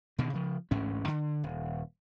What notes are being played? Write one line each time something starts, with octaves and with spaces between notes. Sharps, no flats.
B2 D3 D#3
C#3 F3
A1 D2 G#2 C#4
D3
D#1